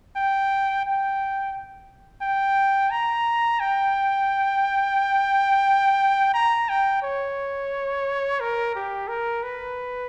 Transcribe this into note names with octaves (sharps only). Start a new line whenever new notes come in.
G5
G5
G5
A#5
G5
A#5
G5
C#5
A#4
G4
A#4
B4